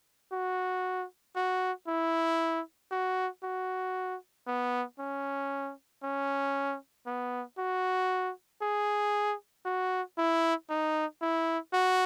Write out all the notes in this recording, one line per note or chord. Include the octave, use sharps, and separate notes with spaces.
F#4
F#4
E4
F#4
F#4
B3
C#4
C#4
B3
F#4
G#4
F#4
E4
D#4
E4
F#4